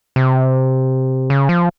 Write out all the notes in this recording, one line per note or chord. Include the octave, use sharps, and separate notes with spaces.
C3
C#3
F3